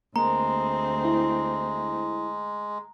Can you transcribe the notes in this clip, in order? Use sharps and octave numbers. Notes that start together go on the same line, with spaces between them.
D2 G#3 A#3 C4 A#5
E4